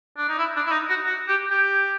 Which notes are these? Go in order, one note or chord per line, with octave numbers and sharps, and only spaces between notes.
D4
D#4
E4
D4
E4
D#4
F#4
F#4
G4
G4